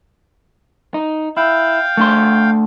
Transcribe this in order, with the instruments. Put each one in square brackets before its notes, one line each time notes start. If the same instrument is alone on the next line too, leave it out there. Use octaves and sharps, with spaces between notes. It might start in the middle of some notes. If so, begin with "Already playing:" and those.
[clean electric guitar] D#4
[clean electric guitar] E4 [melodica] F5 G5
[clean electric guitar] A3 D4 C6